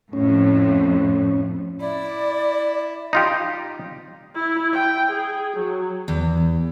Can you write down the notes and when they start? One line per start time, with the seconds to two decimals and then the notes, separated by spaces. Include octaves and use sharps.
0.13 F2 A2 C#4
1.80 E4 D5
3.13 D#4 F4 G4
4.35 E4
4.73 G5
5.11 G#4
5.57 F#3
6.08 E2